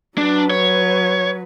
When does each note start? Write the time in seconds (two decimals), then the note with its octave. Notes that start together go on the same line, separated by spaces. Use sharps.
0.18 F#3 D4 B4
0.50 C#5